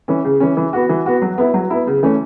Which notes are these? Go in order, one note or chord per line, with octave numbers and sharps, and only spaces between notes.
E3 C#4
C#3
E3 C#4
E3
B3 F#4
E3
B3 F#4
F#3
B3 E4
F#3
B3 E4
C#3
E3 A3 C#4